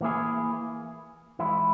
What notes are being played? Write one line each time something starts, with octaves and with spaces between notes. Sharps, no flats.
E3 A#3 E4 G#4
E3 G#3 E4